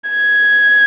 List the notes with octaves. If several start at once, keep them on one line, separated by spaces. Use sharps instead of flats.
G#6